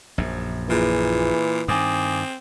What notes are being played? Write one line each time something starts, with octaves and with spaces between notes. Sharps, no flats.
A#1 F#2
A#2 E3 F4 G#4
G2 D#3 C4 G#5 D6 D#6